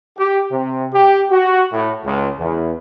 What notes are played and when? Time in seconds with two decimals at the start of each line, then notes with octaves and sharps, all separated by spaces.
0.18 G4
0.51 C3
0.93 G4
1.30 F#4
1.72 A2
2.05 C#2
2.39 E2